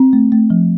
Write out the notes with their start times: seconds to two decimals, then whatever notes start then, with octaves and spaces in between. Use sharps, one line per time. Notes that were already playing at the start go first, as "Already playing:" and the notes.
Already playing: C4
0.13 A3
0.32 A3
0.50 F3